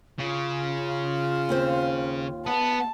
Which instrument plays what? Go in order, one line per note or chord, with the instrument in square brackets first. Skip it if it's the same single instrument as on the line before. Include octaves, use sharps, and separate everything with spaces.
[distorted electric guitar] C#3 [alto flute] F4
[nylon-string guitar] D#2 C4 C5
[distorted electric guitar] B3 [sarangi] A5